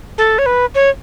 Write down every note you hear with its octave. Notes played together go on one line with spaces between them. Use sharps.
A4
C#5
B4
C#5